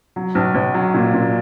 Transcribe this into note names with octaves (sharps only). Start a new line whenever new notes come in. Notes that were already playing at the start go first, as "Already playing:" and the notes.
F#3
B1
B1
F#3
A#2
A#2